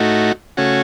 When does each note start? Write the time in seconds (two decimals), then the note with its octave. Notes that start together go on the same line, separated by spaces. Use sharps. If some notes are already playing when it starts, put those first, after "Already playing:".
Already playing: A2 A3 D#4 F#4
0.57 C#3 A3 C#4 F#4